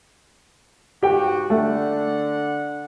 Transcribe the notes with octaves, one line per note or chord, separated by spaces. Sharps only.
G#2 F#4 G4 G5
D3 A3 D5 F#5